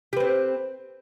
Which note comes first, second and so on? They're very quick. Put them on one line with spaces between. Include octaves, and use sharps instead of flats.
G4 B4 C4